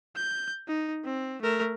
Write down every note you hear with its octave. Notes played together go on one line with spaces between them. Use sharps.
G6
D#4
C4
A3 A#4